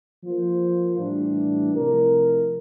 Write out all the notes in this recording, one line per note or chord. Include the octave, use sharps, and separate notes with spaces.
F3 A#3 F4 C5
A2 E3 G3 D4
C3 F3 A3 E4 A#4